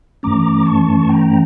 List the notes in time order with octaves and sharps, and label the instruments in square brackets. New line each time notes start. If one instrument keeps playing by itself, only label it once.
[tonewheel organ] G2 E3 A3 C#4 A#5 D6
A5 C#6
G5 A#5